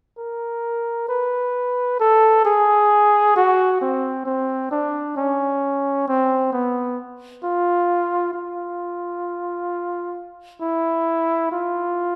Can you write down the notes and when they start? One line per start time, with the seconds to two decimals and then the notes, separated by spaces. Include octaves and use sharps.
0.18 A#4
1.09 B4
2.00 A4
2.45 G#4
3.36 F#4
3.81 C4
4.26 C4
4.71 D4
5.17 C#4
6.08 C4
6.52 B3
7.44 F4
8.34 F4
10.61 E4
11.52 F4